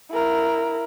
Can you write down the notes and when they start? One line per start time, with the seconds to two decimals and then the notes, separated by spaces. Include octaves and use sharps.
0.12 E4 A#4